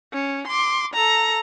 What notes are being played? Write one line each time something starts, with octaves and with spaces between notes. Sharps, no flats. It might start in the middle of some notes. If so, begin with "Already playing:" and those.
C#4
C6 D6
A4 A#5